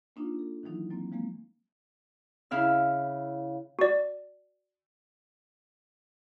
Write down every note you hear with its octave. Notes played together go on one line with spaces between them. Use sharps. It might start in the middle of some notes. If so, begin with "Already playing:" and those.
A#3 D4 D#4 F4
A4
D#3 E3 F#3 D#4 E4
F#3 A#3 C4
F3 G#3 A#3 C4
C#3 E4 F5 E6
F#4 D5